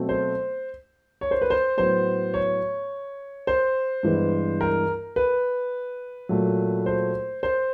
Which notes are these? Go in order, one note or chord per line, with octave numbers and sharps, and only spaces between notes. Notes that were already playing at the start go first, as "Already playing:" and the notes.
Already playing: B2 F#3 A3 C4
C5
C#5
C5
B4
C5
A2 F#3 B3 C5
C#5
C5
G2 E3 G#3 B3
A#4
B4
A#2 F#3 A3
C5
C5